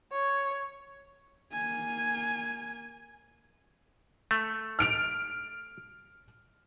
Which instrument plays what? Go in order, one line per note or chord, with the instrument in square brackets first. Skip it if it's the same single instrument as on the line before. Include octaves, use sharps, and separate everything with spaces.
[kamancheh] C#5
[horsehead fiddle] A#3 G#5
[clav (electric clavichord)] A3
[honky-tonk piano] F6 D7 F7